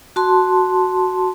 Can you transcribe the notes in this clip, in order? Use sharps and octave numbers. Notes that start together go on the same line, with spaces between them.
F#4 A5 C6